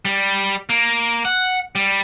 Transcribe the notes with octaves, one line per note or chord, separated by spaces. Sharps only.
G3
A#3
F#5
G3